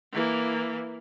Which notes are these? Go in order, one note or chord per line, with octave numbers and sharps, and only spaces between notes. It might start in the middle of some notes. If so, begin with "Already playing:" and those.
E3 A#3